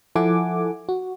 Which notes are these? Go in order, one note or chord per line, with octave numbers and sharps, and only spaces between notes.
F3 E4 A4 F#5 G#5 D6
F#4